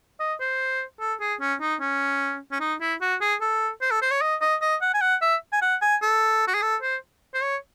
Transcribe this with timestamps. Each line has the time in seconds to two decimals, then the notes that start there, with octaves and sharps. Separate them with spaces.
0.20 D#5
0.41 C5
1.00 A4
1.21 G#4
1.41 C#4
1.61 D#4
1.81 C#4
2.52 C#4
2.60 D#4
2.81 E4
3.01 F#4
3.21 G#4
3.41 A4
3.81 C5
3.91 A4
4.02 C5
4.11 C#5
4.22 D#5
4.41 D#5
4.62 D#5
4.82 F#5
4.94 G#5
5.01 F#5
5.21 E5
5.53 G#5
5.62 F#5
5.82 G#5
6.02 A4
6.47 F#4
6.54 G#4
6.62 A4
6.82 C5
7.34 C5
7.43 C#5